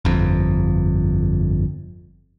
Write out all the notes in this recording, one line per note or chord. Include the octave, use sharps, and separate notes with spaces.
G1 F2